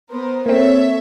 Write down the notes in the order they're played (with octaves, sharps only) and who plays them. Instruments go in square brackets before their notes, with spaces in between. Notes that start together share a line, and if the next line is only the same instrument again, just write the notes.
[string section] B3 A#4 C5
[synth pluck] A#3 C4 [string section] A4 C#5 E5